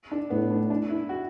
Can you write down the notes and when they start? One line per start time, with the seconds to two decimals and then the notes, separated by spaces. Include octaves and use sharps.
0.12 D4
0.30 A2 B3
0.50 D4
0.70 D4
0.90 E4
1.09 F#4